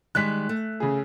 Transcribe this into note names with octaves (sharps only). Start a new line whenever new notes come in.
D#3 G3 G#3 F#6 B6
A3
C#3 G#4